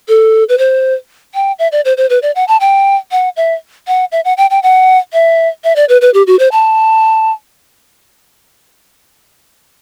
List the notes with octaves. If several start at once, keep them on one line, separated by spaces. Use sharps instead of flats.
A4
B4
C5
G5
E5
D5
C5
C5
B4
D5
F#5
A5
G5
F#5
E5
F#5
E5
F#5
G5
G5
F#5
E5
E5
D5
B4
B4
G4
F#4
C5
A5